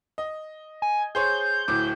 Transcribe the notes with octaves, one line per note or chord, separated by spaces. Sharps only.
D#5
G#5
G#4 C5 C#5 G6
D1 A2 D6